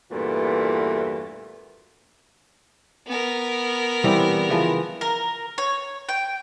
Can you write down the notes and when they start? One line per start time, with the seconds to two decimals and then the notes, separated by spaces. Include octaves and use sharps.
0.11 E2 G2 A#2 E3 A3 F#4
3.07 B3 A#4
4.04 E3 G3 C4
4.49 C#3 E3 F3
5.01 A#4
5.58 C#5
6.09 G5